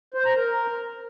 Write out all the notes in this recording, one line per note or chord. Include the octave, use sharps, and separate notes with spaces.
C5
A#5
A#4